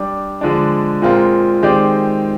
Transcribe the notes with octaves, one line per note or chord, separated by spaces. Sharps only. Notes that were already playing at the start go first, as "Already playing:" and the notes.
Already playing: G3 D4 G4 D5
D3 F3 G#3 D4
A#2 G#3 C4 F4 A#4
D#3 G#3 C4 G4 D5